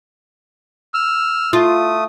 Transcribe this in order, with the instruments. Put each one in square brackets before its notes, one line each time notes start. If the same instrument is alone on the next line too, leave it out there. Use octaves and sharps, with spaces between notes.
[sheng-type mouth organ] E6 F6
[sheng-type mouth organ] A3 D#6 [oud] F4